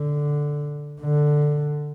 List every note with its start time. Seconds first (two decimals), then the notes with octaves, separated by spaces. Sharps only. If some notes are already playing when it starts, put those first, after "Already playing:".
Already playing: D3
1.01 D3